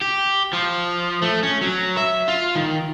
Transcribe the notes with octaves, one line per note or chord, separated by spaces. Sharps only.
G4
F3
A3
C#4
F#3
E5
F4
D#3